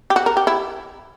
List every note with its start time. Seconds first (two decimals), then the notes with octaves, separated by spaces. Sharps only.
0.10 G4
0.16 F#4
0.26 A#4
0.37 G4
0.47 E4